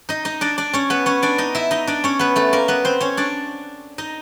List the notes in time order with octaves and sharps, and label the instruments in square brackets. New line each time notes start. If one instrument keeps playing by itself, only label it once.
[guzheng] D#4 D#5
D#4 D#5
D4 D5
D4 D5
C#4 C#5
B3 B4
C#4 C#5
D4 D5
D#4 D#5
E4 E5
D#4 D#5
D4 D5
C#4 C#5
B3 B4
A3 A4
A#3 A#4
B3 B4
C4 C5
C#4 C#5
D4 D5
D#4 D#5